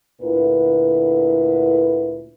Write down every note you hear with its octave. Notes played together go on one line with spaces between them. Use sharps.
D2 A#2 D3 E4 B4